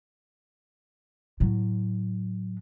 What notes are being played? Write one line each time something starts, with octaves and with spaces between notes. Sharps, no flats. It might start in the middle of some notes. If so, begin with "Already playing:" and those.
A2 F#3